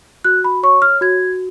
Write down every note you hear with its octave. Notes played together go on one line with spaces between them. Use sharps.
F#4 F#6
B5
C#5 C#6
F6
F#4 G#6